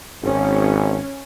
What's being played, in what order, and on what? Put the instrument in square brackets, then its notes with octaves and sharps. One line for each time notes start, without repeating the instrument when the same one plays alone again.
[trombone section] G#1 [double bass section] C#4